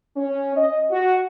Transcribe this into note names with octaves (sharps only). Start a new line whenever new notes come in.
C#4
D#5
F#4